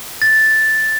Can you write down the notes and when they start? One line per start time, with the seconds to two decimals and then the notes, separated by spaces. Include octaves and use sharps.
0.22 A6